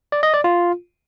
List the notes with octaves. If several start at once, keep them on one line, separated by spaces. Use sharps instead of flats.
D5
D#5
D5
F4